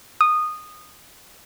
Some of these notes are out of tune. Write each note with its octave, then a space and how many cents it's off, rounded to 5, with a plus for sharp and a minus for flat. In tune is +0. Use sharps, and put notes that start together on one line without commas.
D#6 -15